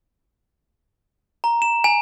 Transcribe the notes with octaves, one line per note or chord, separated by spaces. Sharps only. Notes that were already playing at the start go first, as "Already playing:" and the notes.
A#5
E7
G#5